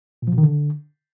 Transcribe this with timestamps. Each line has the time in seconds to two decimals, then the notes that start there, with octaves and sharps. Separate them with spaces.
0.22 A#2
0.28 F3
0.33 B2
0.38 D#3
0.43 D3